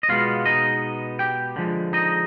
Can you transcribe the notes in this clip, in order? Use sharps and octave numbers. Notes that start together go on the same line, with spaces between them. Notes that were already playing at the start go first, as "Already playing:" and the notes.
D#5
B2 G#3 B3 F4 F5
D#4 D#5
G4 G5
D3 F3 G#3
D#4 D#5